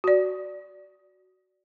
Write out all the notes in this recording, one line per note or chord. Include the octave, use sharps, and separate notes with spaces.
F#4 D5